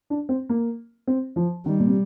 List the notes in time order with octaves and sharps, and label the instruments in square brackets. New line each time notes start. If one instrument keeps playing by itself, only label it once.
[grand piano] D4
C4
A#3
C4
F3
[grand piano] D#3 [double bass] G3
[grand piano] A#2
C3